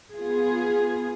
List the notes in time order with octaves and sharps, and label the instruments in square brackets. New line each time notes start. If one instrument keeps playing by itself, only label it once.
[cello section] B3 F4 G#4